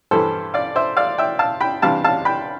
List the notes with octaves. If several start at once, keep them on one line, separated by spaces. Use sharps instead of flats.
G2 E3 G3 A4 C5
D5 F5
C5 E5
D5 F5
E5 G5
F5 A5
G5 B5
C3 E3 G3 D4 F5 A5
F5 A5
G5 B5